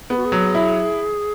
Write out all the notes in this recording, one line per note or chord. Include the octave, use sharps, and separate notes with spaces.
B3 G#4
F#4
G#4
F#3
E4